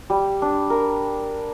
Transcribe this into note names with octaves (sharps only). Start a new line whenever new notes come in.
G3
D4
A#4